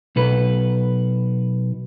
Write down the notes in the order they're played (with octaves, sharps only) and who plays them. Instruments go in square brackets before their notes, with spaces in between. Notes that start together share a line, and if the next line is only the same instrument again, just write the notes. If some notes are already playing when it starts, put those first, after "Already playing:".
[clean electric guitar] B1 A4 B4